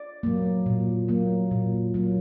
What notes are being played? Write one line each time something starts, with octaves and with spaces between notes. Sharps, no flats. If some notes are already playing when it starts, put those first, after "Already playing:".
Already playing: D5
F#3 A#3
A#2
F#3 A#3
A#2
F#3 A#3